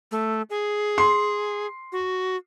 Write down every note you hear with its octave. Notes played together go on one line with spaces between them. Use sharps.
A3
G#4
C6
F#4